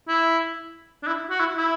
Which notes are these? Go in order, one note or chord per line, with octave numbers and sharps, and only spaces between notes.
E4
D4
E4
F#4
E4
E4